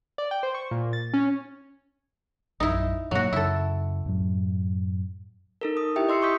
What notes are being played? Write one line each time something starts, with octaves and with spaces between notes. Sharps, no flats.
D5
G5
C5
C#6
A#2
A6
C#4
A#1 F#2 D#4 E4
G2 B2 F#3 A#3 F#4
F#2 C#3 E4 A4
F#2 A2 F#3
D#4 A4 A#4
D#6
E4 G4 E5 G5
D#5 C6 E6 C7 C#7
C6 C#6 D#6 G6 B6